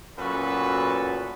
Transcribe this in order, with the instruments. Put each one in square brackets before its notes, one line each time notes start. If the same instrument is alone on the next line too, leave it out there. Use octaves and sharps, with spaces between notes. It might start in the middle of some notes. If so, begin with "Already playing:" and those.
[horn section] F#2 A#2 B3 F#4 A4 B4